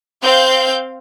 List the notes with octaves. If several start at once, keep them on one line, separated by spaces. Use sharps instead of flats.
C4 F5 G6